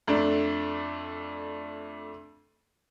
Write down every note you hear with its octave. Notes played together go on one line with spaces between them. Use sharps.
F2 A3 D4